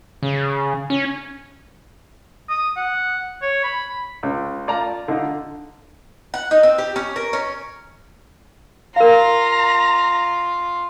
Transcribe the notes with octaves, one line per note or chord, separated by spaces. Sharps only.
C#3
C#4
D#6
F#5
C#5
B5
C#2
F4 D5 A5 A#5
D3 D#4 F4
F#5
D#4
C4
G4
C#4
A#4
C#4
F4 A#4 F5 A#5